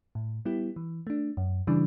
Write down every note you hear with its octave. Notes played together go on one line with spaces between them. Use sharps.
A2
G3 B3 E4 G4
E3
A3 D4
F#2
C#3 E3 G3 D4